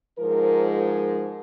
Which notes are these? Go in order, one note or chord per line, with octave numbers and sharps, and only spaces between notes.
G#2 F3 G#3 A#4
A#4